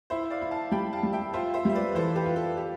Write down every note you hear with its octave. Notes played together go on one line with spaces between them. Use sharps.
E4 C5 E5
D5 F5
E4
F5 A5
G3 G5 B5
F5 A5
G3
E5 G5
F4 C5 E5
C5 E5
G3 E5
B4 D5
E3 A4 C5
G4 B4
F4
A4
G4